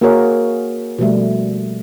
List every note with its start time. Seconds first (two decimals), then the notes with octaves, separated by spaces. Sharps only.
0.01 A#3 F#4 G#4 A#4 C#5
0.98 B2 F3 G3 A3